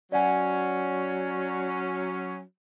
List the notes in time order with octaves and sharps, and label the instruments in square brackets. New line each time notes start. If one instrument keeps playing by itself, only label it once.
[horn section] F#3 C#4 [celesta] D5 F#5 G#5